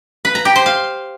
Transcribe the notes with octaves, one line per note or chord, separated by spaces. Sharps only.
B4
A#5
G4
C5
F5